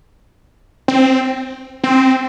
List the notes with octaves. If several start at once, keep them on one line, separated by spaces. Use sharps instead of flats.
C4
C4